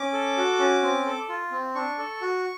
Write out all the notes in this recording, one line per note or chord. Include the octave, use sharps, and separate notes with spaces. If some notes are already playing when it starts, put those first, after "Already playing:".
Already playing: C#4 D6
A4
F#4
C#4
C4
A4
F4
C4
D4 C#6
A4
F#4